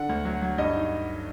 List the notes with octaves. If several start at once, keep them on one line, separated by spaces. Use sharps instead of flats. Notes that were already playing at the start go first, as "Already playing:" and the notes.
Already playing: D3 F#5
D2
F#3
F#3
G2 D#5
D#4